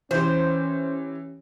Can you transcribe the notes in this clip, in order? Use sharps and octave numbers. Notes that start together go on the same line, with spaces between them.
E3 C#4 G4 C5